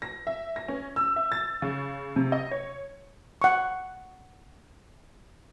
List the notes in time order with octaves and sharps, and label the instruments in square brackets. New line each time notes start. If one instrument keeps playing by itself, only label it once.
[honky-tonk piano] A#6
E5
A#6
C#4
E6
E5
A6
C#3
C3
D#5
C#5
[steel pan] F#5 C#6